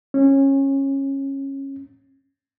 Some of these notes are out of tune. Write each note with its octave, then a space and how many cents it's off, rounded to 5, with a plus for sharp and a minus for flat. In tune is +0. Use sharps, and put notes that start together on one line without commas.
C#4 -20